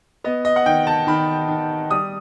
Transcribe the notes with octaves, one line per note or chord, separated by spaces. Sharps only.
B3 D#5
D#5
F#5
D#3 G5
A5
D#3 B5
D#3
G3 D#6